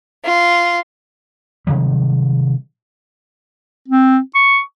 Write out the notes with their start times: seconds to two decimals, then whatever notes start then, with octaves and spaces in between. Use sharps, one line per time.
0.24 F4
1.67 C3 D#3 F#3 G3
3.88 C4
4.35 C#6